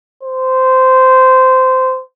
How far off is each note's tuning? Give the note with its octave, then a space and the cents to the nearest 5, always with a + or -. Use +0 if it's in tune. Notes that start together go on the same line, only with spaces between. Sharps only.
C5 -15